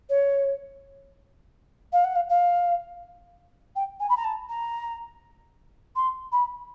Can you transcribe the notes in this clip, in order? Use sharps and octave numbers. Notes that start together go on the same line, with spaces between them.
C#5
F5
F#5
F5
F5
G5
G#5
B5
A#5
A5
A#5
C6
B5